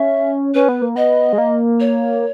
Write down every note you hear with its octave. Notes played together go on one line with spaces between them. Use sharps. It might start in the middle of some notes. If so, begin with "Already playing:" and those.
Already playing: C#4 E5
C#4 B4
B3
A#3
B3 D#5
G#3
A#3
C#5